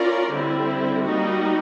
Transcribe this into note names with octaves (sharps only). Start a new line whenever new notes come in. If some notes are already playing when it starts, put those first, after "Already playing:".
Already playing: C#4 F4 A#4 D5
D3 G3 C4 E4
G3 A#3 D#4 F#4